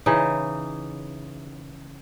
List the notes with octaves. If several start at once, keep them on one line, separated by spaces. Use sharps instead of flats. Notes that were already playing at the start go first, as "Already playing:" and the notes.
C#3 E3 D#4